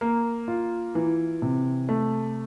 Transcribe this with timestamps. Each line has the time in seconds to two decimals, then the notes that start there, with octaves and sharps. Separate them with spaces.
0.01 A#3
0.48 F4
0.95 E3
1.42 C3
1.89 A3